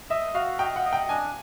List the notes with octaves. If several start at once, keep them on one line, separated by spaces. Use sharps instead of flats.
D#5 E5
F#4 F5
D#5 G5
F#5
D#5
G5
D4 G#5